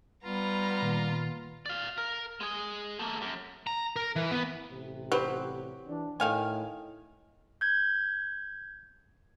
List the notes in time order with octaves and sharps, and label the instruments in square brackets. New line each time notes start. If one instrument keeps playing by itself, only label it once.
[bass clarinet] G3 [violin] B3 A#5 [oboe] F4
[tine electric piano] A#2 D#3 A#3
[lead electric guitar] D5 F5
A#4
G#3 G#4
A3 A#3
F#2
A#5
A#4
E3
B3
[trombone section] A1 C3
[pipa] F#3 [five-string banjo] G4 B4 C5
[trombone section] E3 D4
[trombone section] A2 [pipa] D#3 F5 G#5
[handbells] G6 G#6